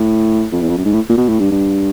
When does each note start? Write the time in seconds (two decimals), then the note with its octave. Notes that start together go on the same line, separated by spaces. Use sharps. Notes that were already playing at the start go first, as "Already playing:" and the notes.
Already playing: A2
0.52 F2
0.61 E2
0.69 F2
0.78 F#2
0.85 G#2
0.93 A2
1.09 A#2
1.17 B2
1.29 A2
1.39 G2
1.51 G2